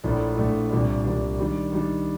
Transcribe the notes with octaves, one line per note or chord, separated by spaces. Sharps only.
A#1 A2 A3 D4
A#1 A2 A3 D4
C2 A#2 G3 D4
C2 A#2 G3 D4
D#3 G3 D4
D#3 G3 D4